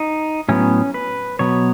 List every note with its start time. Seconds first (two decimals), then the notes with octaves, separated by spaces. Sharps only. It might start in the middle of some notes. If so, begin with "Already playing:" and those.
Already playing: D#4
0.49 A2 F#3 B3 C#4
0.94 B4
1.39 B2 F#3 B3 C#5